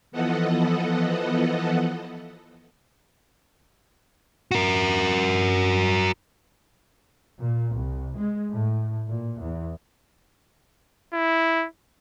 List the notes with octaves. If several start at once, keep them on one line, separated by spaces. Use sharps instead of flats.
E3 F3 B3 A4 D#5 F#5
F#4 A#4
A#2
C2
G#3
A2
A#2
E2
E4